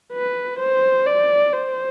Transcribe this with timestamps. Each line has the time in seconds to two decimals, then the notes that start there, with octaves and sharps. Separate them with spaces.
0.13 B4
0.59 C5
1.06 D5
1.53 C5